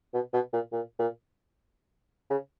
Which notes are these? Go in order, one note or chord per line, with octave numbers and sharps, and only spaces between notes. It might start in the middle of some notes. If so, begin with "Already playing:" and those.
B2
B2
A#2
A#2
A#2
C#3